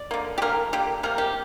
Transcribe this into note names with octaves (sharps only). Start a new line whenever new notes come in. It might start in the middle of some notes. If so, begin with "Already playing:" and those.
Already playing: D5
D3 A#3
G4
D3 A#3 A#4
D3 A#3 G4
C3 A#3 A#4
G4